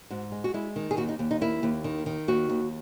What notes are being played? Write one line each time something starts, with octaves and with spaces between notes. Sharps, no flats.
G#2 F#4
G#3
F#4
G#3 E4
D#3
G#4
D#2 F#4
D#4
D#2
D#4
A#3 E4
D#2
D#3
D#3
D#2 F#4
D#2